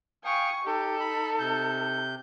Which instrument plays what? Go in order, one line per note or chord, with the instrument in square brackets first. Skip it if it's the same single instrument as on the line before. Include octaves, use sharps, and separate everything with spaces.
[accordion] F5 G5 D#6 [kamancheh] G#5 C#6
[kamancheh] D#4 A4 [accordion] G4
[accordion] B5
C3 G6